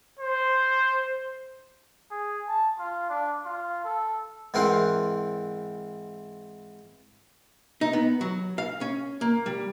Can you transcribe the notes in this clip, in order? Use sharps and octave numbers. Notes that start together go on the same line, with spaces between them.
C5
G#4
A5
F4
D4
F4
A4
G#2 E3 C4 A#4 F#5 C6
D#4
B3
F#3
F5
C#4
A#3
G3